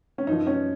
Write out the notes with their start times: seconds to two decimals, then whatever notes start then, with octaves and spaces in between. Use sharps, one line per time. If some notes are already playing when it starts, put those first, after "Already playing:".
0.18 C#4
0.27 F#2 F3 D#4
0.47 C#4